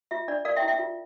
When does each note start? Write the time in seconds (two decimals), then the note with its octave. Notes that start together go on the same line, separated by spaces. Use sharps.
0.11 F4 E5
0.28 D4 D5
0.45 A#4 D5 F5
0.56 E5 G5
0.62 E4
0.68 E5 G5
0.79 F4